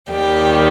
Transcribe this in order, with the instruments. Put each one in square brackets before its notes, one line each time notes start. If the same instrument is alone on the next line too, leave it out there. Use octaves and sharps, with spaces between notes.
[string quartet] D#2 D#3 G3 G4